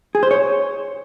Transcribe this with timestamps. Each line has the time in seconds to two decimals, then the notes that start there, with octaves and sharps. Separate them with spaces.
0.15 G#4
0.23 C5
0.31 C#5